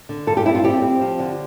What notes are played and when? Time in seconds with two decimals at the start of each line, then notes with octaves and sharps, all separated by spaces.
0.09 D3
0.27 G2 A4
0.37 G4
0.45 C4 E4
0.55 F4
0.64 C4 G4
0.82 C4
1.01 F3
1.19 D3